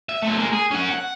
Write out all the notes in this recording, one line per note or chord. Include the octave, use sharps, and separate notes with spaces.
E5
A3 C4
G#3 A#3
G#4
C#4 F#5
F#5